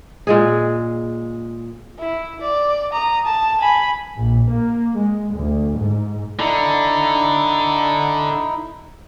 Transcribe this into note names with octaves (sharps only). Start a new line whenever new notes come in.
A#2 G#3 G#4
E4
D5
A#5 D#6
A5
G#5 B5
A#1
A#3
G#3
D2
G#2
D3 D#4 E4